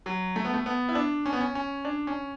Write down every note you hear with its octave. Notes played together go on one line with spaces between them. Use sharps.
F#3
A3
B3
A3
B3
E4
D4
C#4
B3
C#4
C#4
D4
C#4